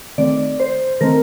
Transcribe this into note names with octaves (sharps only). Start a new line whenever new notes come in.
D#3 A3 C4 D5
C5
D#3 A3 C4 A#4